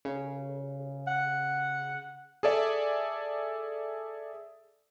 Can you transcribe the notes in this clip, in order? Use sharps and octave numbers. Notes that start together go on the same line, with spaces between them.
C#3
F#5
G#4 A4 D5 E5